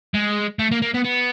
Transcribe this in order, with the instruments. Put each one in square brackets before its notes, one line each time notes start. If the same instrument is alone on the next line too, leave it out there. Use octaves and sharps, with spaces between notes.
[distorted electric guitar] G#3
A3
A#3
A#3
B3
B3